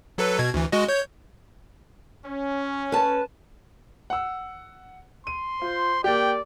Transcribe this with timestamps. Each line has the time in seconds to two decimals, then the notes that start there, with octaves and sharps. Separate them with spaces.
0.18 F#3 A4 B4
0.39 B2 G#6
0.54 D2 E3
0.72 G#3 F#4 D#5
0.88 C#5 G6
2.26 C#4
2.92 B4 A5
4.10 F#5 E6
5.27 C6 D#7
5.62 F4 C5
6.04 A#3 G4 D5 G5